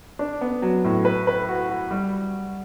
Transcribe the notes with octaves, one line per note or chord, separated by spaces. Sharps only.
D4
B3
F#3
A2
B4
B4
F#4
F#4
G3